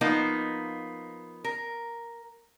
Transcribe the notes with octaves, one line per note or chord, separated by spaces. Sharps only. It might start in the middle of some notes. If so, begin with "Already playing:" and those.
F3 A#3 B3 D#4
A#4